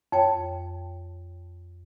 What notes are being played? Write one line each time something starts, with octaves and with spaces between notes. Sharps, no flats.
F2 C#5 G5